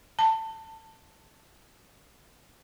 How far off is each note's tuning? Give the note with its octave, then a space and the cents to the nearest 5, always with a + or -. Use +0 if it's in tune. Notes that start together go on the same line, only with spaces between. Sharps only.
A5 +20